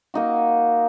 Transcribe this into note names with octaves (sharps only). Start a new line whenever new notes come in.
A#3 D#4 F#4